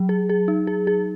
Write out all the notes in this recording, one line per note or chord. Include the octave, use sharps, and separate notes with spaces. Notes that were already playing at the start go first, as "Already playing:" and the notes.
Already playing: F#3
G#4
G#4
D#4
G#4
G#4